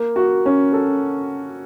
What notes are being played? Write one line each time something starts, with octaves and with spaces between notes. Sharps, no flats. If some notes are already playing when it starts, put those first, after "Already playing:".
Already playing: A#3
F#4
C#4
A4